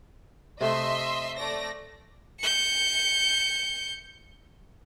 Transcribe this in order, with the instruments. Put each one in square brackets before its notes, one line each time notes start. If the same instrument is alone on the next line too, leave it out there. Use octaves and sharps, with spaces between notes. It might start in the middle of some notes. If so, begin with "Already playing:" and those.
[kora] C3 A3 [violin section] D#5 E5 C6
[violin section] A3 D5 A#6
[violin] G6 C#7